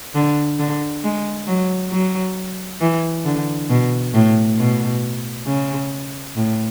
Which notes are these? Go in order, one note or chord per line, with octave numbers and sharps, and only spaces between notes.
D3
D3
G#3
F#3
F#3
E3
D3
B2
A2
B2
C#3
A2